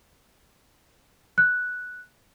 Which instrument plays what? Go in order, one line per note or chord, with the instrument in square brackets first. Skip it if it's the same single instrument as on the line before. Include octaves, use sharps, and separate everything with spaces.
[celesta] F#6